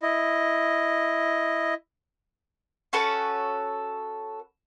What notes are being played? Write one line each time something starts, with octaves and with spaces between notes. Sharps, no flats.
E4 D#5
C#4 F#4 A4 B4